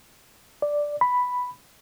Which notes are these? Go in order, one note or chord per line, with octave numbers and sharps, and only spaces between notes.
D5
B5